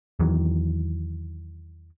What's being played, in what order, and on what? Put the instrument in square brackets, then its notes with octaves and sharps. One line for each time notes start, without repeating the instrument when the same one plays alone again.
[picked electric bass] E2 D#3 E3 F#3